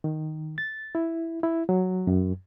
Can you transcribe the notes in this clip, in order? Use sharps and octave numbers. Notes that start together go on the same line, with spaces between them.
D#3
A6
E4
E4
F#3
F#2